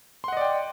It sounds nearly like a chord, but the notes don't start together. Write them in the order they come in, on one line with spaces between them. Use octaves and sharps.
C6 F#5 D#5 D5 G5